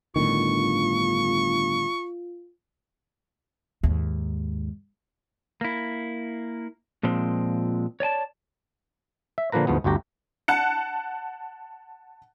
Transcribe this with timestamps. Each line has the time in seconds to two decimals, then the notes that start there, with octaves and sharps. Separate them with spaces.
0.16 G1 A2 D3 D#3 F4 C#6
3.83 D#2 G#2
5.61 A#3 E4
7.03 A#2 F3 G#3 C4
8.00 C#5 D5 G#5 A5
9.38 E5
9.52 A#2 D3 F3 A#3 B4 A#5
9.67 D2 G#2 F3 B3
9.84 G1 D2 F#4 G4 A#5
10.48 F#5 A5 F#6 C#7